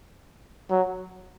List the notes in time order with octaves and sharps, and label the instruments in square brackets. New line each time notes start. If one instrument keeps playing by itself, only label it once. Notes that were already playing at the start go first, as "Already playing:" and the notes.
[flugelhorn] F#3